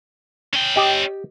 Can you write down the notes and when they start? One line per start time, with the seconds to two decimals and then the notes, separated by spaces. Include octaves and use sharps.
0.54 C#4 G5
0.76 G4 D#5